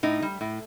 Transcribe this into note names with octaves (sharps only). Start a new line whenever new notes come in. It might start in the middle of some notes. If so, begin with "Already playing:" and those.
A2 D#4
G3
A2